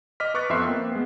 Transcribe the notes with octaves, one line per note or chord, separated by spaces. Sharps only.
D#5 D6 F6 B6
B4 C#6 D6 F#6 A6
F2 B3 C4 E5 C6 C7
A#3 C4
G#3 B3